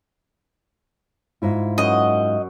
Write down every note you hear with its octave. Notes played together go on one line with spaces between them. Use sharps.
G#2 E4 F4
F#2 D#5